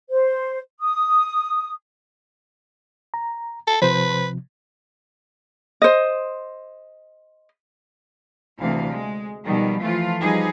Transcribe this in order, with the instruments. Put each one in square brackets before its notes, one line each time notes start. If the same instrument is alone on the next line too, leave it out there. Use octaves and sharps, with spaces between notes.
[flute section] C5
D#6
[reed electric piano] A#5
[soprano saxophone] A4
[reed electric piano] C3 F3 [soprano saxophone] B4 [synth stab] C5
[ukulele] C5 D#5
[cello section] D2 C3 E3 F5
G#3
B2 D#3 F3 G3
E3 F3 A3 F4
F3 G3 D#4 G#4 B4